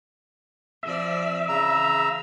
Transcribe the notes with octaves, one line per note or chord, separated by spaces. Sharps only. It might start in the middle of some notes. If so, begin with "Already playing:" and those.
F3 C4 D5 E5
C#3 E3 G#4 A#5 E6